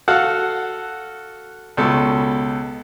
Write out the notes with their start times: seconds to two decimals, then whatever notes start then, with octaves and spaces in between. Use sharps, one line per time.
0.08 F#4 A4 F5 F#5
1.77 C#2 B2 A4